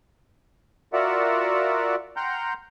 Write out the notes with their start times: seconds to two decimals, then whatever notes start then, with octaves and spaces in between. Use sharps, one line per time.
0.93 F4 F#4 A#4 D5 E5 F#5
2.17 F#5 G5 A#5 C6 F6 G6